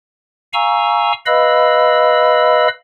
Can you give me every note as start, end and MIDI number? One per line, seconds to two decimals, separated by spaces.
0.53 1.12 77
0.53 1.12 80
0.53 1.12 82
0.53 1.12 85
0.53 1.12 88
1.26 2.68 71
1.26 2.68 75
1.26 2.68 77
1.26 2.68 83
1.26 2.68 88